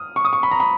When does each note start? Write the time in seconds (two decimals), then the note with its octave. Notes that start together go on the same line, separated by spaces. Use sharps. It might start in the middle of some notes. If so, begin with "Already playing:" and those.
Already playing: D#6 F6
0.16 C#6
0.25 D#6
0.33 C#6
0.43 B5
0.51 A#5
0.60 B5